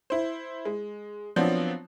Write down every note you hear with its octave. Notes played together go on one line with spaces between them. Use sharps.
E4 C5
G#3
F3 F#3 B3 C4 D4